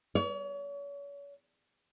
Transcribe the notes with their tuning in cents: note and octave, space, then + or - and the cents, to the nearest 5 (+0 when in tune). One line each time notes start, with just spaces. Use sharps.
C#5 +40